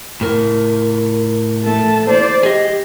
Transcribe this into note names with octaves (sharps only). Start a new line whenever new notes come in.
A2 A#4
A3 A5
C5 D5
G4 G#4 D#5